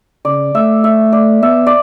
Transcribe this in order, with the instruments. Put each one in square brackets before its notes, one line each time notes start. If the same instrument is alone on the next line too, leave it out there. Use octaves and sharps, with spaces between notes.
[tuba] C#3 [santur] D5
[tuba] A3 [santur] E5
[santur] E5
D5
[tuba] B3 [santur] E5
[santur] D5